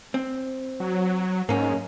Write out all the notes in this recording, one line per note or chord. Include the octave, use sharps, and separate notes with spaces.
C4
F#3
G#2 A#3 C#4